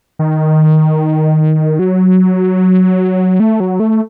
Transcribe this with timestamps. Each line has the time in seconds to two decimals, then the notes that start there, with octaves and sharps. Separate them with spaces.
0.19 D#3
1.79 F#3
3.40 A3
3.60 F#3
3.80 A3